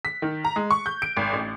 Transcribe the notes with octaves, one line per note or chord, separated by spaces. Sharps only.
B6
D#3
A#5
G#3
C#6
G6
D7
G#1
A1